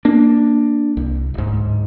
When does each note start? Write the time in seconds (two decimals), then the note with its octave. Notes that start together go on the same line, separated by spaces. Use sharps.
0.05 A#3 D4
0.97 C2
1.34 D1 G#2